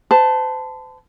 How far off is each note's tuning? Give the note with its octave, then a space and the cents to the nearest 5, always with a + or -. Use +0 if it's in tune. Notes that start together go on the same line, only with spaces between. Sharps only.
C5 -40 A5 +0